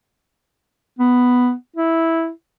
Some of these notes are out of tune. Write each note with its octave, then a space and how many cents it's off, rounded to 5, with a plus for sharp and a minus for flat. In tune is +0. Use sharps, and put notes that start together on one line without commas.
B3 +5
E4 -5